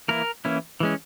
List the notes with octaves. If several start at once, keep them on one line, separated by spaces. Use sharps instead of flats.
E3 A#3 E4 A#4
E3 A#3 C#4 E4
E3 G#3 C#4